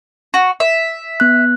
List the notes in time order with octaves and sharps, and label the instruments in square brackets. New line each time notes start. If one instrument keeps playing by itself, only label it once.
[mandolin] F#4
E5
[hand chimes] B3 F#6